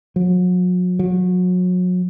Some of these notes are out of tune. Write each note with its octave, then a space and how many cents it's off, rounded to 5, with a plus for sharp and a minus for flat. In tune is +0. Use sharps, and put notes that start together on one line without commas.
F#3 -40
F#3 -35